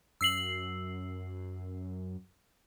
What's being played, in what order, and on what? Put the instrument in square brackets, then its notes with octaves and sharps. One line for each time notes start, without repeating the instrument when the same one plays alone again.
[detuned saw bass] F#2 [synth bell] E6 C7 F#7